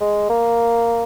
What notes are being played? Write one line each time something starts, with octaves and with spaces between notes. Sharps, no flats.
G#3
A#3